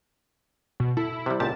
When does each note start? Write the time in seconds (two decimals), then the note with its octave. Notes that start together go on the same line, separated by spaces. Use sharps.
0.80 B2
0.97 E4 A4
1.26 C3 G3
1.40 C#2 A#2 G4 A5